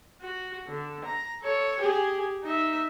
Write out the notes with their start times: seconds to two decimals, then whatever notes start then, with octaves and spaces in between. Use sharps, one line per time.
0.22 F#4
0.68 D3
1.05 A#5
1.42 A4 C#5
1.79 G4 G#4
2.43 D#4 E5